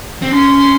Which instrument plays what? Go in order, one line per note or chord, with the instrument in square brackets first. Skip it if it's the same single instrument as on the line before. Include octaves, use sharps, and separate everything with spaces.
[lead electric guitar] C4
[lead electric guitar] C#4 [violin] C6